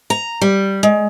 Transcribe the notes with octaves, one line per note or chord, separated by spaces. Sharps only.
A#5
G3
G#3